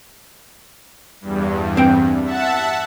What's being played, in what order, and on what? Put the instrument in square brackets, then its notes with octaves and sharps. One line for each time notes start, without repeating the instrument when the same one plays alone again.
[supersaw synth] E2 G2
[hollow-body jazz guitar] C4 G5
[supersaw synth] E5 F#5 A5